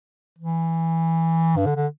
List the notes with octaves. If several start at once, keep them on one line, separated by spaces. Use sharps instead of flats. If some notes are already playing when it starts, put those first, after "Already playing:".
E3
G2
D3
D3